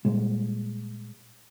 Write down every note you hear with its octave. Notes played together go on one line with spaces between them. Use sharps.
A#2 G3 G#3